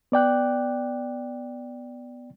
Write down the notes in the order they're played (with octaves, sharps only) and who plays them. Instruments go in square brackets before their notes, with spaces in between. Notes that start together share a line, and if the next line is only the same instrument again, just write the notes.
[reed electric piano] B3 D5 G5 F#6